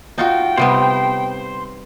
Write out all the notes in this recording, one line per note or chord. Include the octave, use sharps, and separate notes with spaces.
D#4 F4 F#4 G5
C3 G3 B3 C5